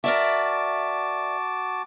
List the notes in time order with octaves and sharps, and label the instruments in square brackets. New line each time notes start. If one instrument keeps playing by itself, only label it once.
[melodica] F#4 A5 D6 [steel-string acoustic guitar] A#4 D5 E5